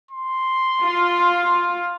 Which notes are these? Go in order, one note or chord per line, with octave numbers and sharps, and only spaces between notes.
C6
F4